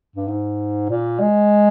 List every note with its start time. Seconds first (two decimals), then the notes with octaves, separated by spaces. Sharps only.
0.16 G2
0.28 G#2
0.89 A#2
1.20 G#3